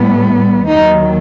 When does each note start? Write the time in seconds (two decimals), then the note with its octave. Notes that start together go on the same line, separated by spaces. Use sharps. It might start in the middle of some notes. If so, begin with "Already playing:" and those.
Already playing: A2 G3 B3
0.67 D#2 D#3 F#3 D#4